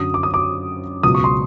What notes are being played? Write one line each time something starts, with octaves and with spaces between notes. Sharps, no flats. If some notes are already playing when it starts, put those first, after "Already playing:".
Already playing: F#2 D3 F#3 D#6
D6
D#6
D6
C#2 B2 F#3 D#6
C#6
C6